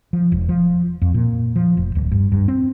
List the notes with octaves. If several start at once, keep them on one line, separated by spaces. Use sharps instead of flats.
F3
E1
F3
F2
A#2
F3
F1
D1
G2
G2
C4